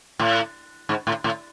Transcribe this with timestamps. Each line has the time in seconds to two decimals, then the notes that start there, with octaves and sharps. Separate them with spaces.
0.19 A2
0.89 G#2
1.07 A2
1.24 A2